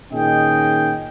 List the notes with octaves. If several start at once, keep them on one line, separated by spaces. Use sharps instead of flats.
A#2 D#3 C#4 G#4 D#5 G5